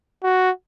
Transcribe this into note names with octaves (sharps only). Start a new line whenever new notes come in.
F#4